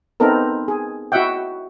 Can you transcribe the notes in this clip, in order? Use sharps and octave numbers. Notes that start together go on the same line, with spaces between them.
B3 C4 D#4 A4 A#4
G#4
E4 F#4 D#5 E5 F#5 G5